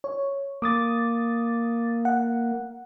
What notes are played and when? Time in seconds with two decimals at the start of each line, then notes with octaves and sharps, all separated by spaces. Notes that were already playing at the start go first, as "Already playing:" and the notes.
0.04 C#5
0.62 A#3 D6 D#6 A6
2.05 F#5